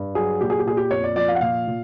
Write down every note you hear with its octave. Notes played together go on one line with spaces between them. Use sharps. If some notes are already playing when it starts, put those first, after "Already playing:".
Already playing: G2
F#3 G#4
A#2 G4
G#4
G4
A#2 G#4
G4
F2 C#5
D5
F3 D5
F5
F#5
A#2 F5
A#2